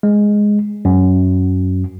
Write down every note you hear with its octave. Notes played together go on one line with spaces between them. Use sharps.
G#3
F#2